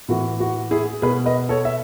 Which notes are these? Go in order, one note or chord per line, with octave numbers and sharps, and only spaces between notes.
A2 E3 F#4
F#4
E4 G#4
B2 G#4 B4
B4 D#5
A4 C#5
E5